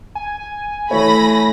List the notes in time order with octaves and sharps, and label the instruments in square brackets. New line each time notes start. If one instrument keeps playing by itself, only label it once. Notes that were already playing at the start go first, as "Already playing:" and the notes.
[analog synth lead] G#5
[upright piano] E3 C#5 [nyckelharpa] A3 [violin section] B5 A#6